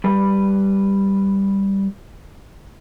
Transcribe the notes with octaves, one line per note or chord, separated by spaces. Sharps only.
G3 B4